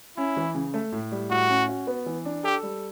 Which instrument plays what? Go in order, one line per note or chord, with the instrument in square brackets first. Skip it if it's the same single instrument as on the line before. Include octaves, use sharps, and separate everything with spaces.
[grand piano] C#4 [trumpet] E4
[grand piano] E3
C#3
A3
A2
G3
[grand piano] A2 [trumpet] F#4
[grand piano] C#4
F#4
B3
E3
D4
[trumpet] G4 [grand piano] A4
[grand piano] G3